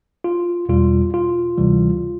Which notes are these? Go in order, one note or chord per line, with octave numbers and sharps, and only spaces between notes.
F4
E2 B2 G3 F4
F4
D2 C3 E3 G3